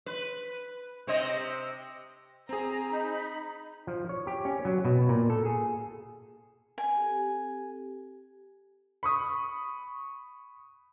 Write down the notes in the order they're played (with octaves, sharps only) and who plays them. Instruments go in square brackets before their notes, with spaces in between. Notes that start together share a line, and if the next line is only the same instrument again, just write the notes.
[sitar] B4
C3 C5 D#5
[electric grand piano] C4 G#4 [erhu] A#5
[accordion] D#4 [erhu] B5
[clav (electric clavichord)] F3
C#5
G4
C#4
F#3
B2
A#2
A4
G#4
[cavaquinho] G#5
[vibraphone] C4 G4 A4
[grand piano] B5 C#6 D#6